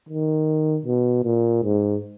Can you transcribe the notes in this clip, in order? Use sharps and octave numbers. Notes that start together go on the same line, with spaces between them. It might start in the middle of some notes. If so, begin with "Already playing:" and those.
D#3
B2
A#2
G#2